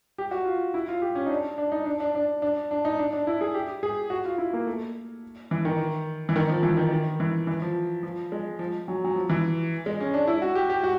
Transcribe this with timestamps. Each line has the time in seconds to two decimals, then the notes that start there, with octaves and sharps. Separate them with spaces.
0.18 G4
0.31 F#4
0.45 F4
0.74 E4
0.88 F4
1.02 G4
1.15 C#4
1.26 D#4
1.30 D4
1.58 D4
1.72 D#4
1.86 D4
2.00 D4
2.15 D4
2.42 D4
2.71 D4
2.85 D#4
2.99 D4
3.13 D4
3.27 E4
3.41 G#4
3.54 G4
3.83 G#4
4.10 F#4
4.25 F4
4.38 E4
4.53 A#3
4.67 A3
5.51 E3
5.65 D#3
6.29 E3
6.36 D#3
6.49 F3
6.63 E3
6.77 D#3
6.91 D#3
7.20 E3
7.47 E3
7.62 F3
8.03 F3
8.32 G#3
8.59 F3
8.88 F#3
9.04 F#3
9.16 F3
9.30 E3
9.86 G#3
10.00 C#4
10.14 D4
10.27 E4
10.42 F#4
10.55 G4
10.70 G4
10.83 F#4